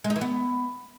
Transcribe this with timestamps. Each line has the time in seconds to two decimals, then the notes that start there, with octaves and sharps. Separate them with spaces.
0.04 G#3
0.10 D#4
0.16 E3
0.21 B3